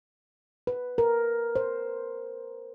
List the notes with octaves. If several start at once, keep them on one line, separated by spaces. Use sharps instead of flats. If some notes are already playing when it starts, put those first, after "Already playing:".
B4
A#4
C5